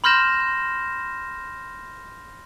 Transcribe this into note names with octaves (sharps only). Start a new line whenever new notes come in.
B5 C6 F6 G6 A#6 E7